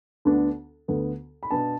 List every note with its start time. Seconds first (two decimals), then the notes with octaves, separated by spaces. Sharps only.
0.25 D2 D3 B3 D4
0.88 D2 D3 B3
1.43 B5
1.51 B2 B3 D4 A5